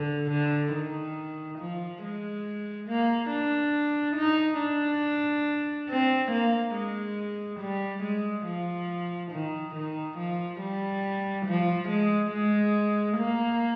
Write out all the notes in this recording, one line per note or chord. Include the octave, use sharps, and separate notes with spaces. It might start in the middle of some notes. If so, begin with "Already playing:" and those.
Already playing: D3
D3
D#3
F3
G#3
A#3
D4
D#4
D4
C4
A#3
G#3
G3
G#3
F3
D#3
D#3
F3
G3
F3
G#3
G#3
A#3